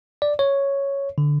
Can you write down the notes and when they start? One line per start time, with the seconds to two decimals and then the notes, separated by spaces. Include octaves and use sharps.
0.22 D5
0.39 C#5
1.18 D3